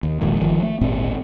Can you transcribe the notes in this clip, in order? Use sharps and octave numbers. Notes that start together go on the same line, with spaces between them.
D#2
E1 A#1 D#2 G#2
G1 D#3 F3
A3
D1 G#1 A#2 C4